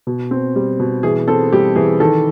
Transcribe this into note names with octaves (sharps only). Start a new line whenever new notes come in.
B2
C4
G3
B2
E3 G#4
C4 A4
G3 G4
E3 G#4
D#3 A4